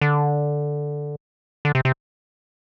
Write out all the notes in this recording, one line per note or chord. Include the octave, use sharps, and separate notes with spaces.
D3
D3
C3
C3